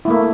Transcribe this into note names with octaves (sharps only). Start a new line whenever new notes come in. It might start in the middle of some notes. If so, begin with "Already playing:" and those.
A3 A#3 E4